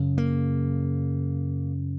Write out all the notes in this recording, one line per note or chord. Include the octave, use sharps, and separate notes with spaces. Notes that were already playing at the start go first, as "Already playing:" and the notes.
Already playing: F#2 C#3
A#3